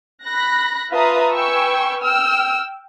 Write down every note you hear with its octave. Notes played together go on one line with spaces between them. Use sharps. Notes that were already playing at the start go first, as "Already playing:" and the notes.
B5 F#6 A#6
F4 B4 E5 A5 A#5 D#6
B4 G5 G#5 C#6 E6
G5 E6 F6